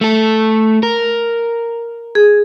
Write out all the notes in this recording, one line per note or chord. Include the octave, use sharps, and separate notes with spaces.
A3 A4
A#4
G#4